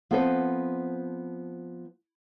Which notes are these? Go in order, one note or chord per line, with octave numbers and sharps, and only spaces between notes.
F3 B3 C4 A4 B4 C5